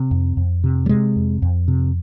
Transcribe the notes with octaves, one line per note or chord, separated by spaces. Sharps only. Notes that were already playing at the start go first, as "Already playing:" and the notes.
Already playing: C3
F2
F2
C3
G3
C3 G#3
F2
F2
C3